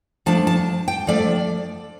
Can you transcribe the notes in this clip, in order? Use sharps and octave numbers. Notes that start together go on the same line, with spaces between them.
F3 A3 D4 A5
A5
G5
F3 A3 D4 D5